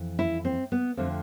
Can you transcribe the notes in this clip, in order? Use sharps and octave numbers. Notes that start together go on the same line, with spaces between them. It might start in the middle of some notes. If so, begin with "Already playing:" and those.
Already playing: F2 E3
E4
C4
B3
F2 D3 F3 A3 C4